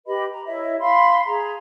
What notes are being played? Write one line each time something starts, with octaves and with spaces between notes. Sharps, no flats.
G4 B4 D#5 B5
A#5
E4 C#5 D#5 E5
F5 B5 C6
G#4 A#5